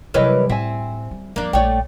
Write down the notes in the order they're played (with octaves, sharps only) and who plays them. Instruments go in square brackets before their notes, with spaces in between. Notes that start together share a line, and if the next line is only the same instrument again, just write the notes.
[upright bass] C3 F#3 [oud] E3 G3 B4 [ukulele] A#4 C#5 D#5
[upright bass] A2 [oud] C4 [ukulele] E5 G#5
[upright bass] G3
[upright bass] F2 F3 [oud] A#3 D4
[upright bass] A#1 [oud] A3 C#5 [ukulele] D5 G5